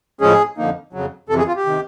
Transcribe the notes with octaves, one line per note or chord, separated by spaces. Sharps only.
A2 F3 G#3 C#4 G#4
F2 D3 F3 A#3 D#4
F2 C#3 F#3
F2 C3 E3 A4
G#4
F4
G4
C3 D#3